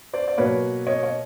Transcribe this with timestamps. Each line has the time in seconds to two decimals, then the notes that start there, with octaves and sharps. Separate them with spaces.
0.13 C5 D5
0.28 D5
0.38 B2 F#3 A#3 B4 C#5
0.87 C#5 D#5
1.03 C#5 D#5